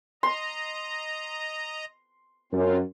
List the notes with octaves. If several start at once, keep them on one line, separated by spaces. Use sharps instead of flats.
D#5 A#5 C6
F#2 C4 C#4 F4